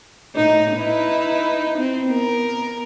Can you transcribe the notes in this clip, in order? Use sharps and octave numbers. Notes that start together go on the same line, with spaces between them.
A2 D#4
D#4 E4 B4
C4
B3 A#4